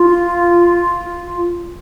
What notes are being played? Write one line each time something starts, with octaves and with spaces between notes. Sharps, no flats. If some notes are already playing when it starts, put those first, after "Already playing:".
Already playing: F4